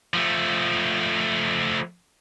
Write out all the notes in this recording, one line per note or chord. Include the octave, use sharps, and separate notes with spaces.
F3 A3